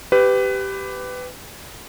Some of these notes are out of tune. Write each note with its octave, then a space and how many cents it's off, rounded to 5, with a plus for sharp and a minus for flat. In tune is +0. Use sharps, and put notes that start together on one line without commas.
G4 -5 B4 +20